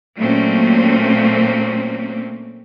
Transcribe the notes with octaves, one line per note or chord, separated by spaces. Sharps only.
A#2 F#3 A3 A#3 C4 C#4